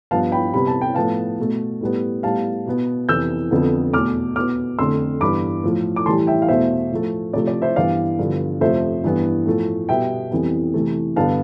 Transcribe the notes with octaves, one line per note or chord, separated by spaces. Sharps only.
G2 F3 B3 F5 A5
G5 B5
C3 G3 B3 B5
A5
G5
A2 F3 B3 F5 A5
B2 A3
A2 G3 B3
A2 G3 B3 F5 A5
B2 B3
F2 C3 E3 B3 E6 G6
F2 D3 F3 B3
E2 B2 A3 D6 F6
B2 B3 D6 F6
F2 D3 A3 C6 E6
G2 E3 B3 B5 D6
A2 F3 A3
D6
A2 E3 G3 A5 C6
E5 G5
F5
E2 B2 A3 C5 E5
A2 F3 A3
C3 F3 A3 D5
D5
C5 E5
G2 E3 B3 D5 F5
G2 D3 F3 B3
F2 C3 F3 A3 C5 E5
G2 E3 B3
A2 F3 A3
B2 G3 B3 E5 G5
F2 E3 G3 B3
C3 E3 A3
G2 D3 G3 B3 F5 A5